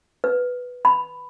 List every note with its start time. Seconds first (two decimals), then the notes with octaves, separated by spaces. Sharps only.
0.24 B4
0.85 B5